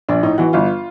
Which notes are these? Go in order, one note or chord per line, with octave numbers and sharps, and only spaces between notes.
A#1 D4
A2 D#4
E3 F#4
G1 F4